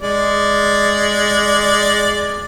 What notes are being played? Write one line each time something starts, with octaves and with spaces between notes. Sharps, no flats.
G#3 D5